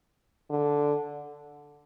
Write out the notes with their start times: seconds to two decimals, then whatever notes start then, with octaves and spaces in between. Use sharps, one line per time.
0.50 D3